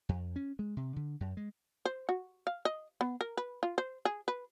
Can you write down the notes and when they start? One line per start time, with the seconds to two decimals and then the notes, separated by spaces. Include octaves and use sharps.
0.09 F2
0.36 C#4
0.59 G#3
0.77 C3
0.96 D3
1.20 F#2
1.37 G#3
1.85 C5
2.09 F#4
2.47 F5
2.65 D#5
3.01 B3
3.21 A#4
3.37 B4
3.63 F4
3.78 C5
4.05 G#4
4.28 B4